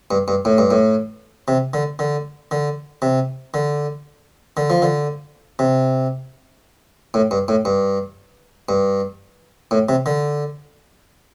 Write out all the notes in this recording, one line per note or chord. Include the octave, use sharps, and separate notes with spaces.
G2
G2
A2
G2
A2
C3
D3
D3
D3
C3
D3
D3
F3
D3
C3
A2
G2
A2
G2
G2
A2
C3
D3